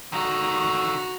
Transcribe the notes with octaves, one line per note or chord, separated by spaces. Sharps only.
D3 D#3 F#4 A#5